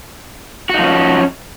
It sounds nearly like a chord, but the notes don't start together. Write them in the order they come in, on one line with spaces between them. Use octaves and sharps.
F#4 D#4 F3 C#4